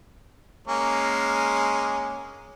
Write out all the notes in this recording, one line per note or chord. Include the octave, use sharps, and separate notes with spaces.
G#3 A#3 C#4